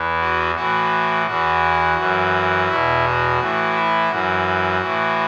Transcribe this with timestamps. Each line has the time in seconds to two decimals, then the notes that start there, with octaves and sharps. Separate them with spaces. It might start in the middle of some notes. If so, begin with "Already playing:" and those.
Already playing: E2 E3
0.20 F#4
0.55 A2 E3 F#4
1.26 E2 E3 F#4
1.97 F#2 E3
2.68 E2 B2 E4
3.04 F#4
3.39 A2 E3
3.75 E4
4.10 F#2 E3 F#4
4.81 A2 E3